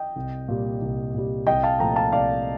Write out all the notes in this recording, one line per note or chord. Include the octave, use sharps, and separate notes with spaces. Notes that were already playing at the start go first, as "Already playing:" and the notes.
Already playing: D#5 G5
C2
A#2 G3
C2
A#2 G3
C2 D#5 G5
F5 A5
A#2 F3 A3 G5 A#5
F5 A5
C2 D5 F5